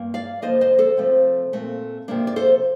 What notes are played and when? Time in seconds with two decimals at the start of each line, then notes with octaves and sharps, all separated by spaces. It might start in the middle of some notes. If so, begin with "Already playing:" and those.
Already playing: G2 A#3
0.14 D5 F5
0.42 D3 F3 A#3 C5 D#5
0.61 C5 D#5
0.79 A4 C5
0.97 C3 F3 A3 C4
1.53 A#2 A3 C4
2.08 C3 F3 A#3 D4
2.27 D5
2.36 A4 C5